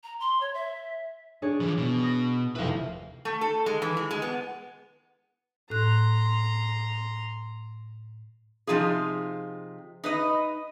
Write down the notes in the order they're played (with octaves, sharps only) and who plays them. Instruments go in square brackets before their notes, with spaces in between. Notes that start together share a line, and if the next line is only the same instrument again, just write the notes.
[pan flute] A#5
C6
C#5
E5
[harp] D4 G#4 C#5
[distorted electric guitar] E3 F3 [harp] D6
[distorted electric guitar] B2
[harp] D#6 A#6 D#7
[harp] F1 D#2 E4 [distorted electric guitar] B4 F5
[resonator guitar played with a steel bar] A3
A4
G#3
E3
G#3
G#3
B3
[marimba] A2 F#6 [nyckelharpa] A#5 C6
[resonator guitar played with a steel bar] C3 F3 D#4 F4 G#4
D#4 B4 D#5